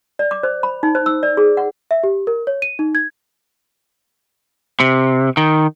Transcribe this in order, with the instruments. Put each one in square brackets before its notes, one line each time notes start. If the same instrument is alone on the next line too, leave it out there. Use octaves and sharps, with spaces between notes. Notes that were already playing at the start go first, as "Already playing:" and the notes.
[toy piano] D5
D6
C5
B5
D#4
C5
E6
D5
G#4
F#5
[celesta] E5
G4
A#4
C#5
D#7
D#4
G#6
[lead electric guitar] C3
D#3